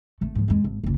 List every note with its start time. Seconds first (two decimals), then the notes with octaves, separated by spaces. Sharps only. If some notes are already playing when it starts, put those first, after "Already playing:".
0.21 G#1 A3
0.35 G#2 F3
0.48 F2 G#3
0.64 G#1
0.84 F#1 C#2